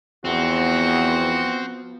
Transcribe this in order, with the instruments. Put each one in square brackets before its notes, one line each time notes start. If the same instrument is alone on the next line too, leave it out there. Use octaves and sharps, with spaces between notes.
[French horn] E2 [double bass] F3 B3 [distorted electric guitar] C4 [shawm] F#4